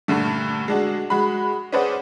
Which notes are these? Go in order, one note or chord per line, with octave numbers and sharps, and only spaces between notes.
G2 A#2 D3 A3
G#3 D4 F#4
G#3 F#4 B5
C#4 G#4 B4 C5 D5 F#5